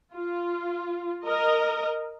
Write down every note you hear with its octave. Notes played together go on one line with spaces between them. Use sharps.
F4
A#4 D#5